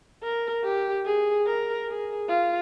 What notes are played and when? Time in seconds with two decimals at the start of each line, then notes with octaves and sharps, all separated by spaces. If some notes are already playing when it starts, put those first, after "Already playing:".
0.23 A#4
0.64 G4
1.06 G#4
1.47 A#4
1.88 G#4
2.29 F4